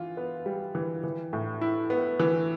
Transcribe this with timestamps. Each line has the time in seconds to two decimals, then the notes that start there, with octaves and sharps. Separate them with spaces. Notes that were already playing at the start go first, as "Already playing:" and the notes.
Already playing: E3 F4
0.17 B3
0.46 G3
0.75 E3
1.04 E3
1.33 A2
1.61 E4
1.90 B3
2.20 E3